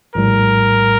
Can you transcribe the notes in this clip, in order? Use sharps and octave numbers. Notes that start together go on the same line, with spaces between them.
A#1 A2 G3 A#4